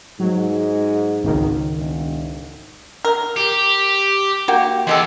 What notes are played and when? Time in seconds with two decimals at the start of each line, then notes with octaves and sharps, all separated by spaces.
0.20 G#2 F#3
1.23 G#1 C#2 D#3
1.76 E1
3.05 A#4
3.36 G4
4.48 A#3 F#4 G4
4.87 E2 G#3 G4 A4